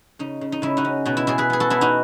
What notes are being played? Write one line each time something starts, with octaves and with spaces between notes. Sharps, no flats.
C#3 D#4
C#3
D#4
C#3 E4
D#4 F#4
C#4
B2 D#4 F#4
E4
B2 E4 G#4
G#4 B4
B3 G#4
F#4 A4
B3 E4 G#4
D#4 F#4